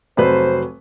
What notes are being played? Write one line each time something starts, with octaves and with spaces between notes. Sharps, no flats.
F1 F#3 B4 C5